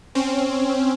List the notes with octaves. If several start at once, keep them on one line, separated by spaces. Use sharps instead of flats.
C4 C#4